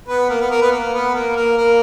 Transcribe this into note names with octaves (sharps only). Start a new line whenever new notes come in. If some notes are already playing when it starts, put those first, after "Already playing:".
B3 B4
A#3 A#4
B3 B4
A#3 A#4
B3 B4
A#3 A#4
B3 B4
A#3 A#4
A#3 A#4
A#3 A#4